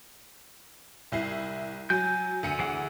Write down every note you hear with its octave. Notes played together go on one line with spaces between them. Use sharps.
C2 E4 C7
F#3 G#5 G6
D2 C#7 D#7
E3 G#4 F#5